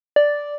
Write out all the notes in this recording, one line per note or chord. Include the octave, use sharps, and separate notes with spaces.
D5